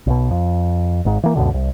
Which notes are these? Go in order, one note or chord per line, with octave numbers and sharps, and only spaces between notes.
B1 B2
F2
G#1 G#2
E3 A#3
C#2 F#2 B2 D3
C2